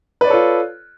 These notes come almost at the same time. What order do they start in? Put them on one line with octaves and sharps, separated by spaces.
B4 D5 C#5 A4 F4